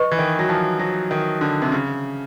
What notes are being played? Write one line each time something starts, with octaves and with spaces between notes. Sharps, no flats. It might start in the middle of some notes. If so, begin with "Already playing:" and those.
Already playing: B4 D#5 C#6
E3
D#3
F#3
F3
F#3
D#3
D3
C3
C#3